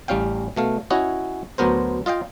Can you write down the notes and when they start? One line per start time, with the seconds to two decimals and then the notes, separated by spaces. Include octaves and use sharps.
0.08 A1 G3 C#4 F5 G5
0.56 B2 A3 F5
0.90 C#4 E4 F#4 C#5 D#5
1.58 D2 F#3 B3 A#4 C5
2.06 F4 D#5 F5 G5